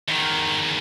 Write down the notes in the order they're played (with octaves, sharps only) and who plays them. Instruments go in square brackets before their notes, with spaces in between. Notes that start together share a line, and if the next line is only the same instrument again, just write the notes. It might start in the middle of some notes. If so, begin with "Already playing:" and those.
[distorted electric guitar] E2 D#3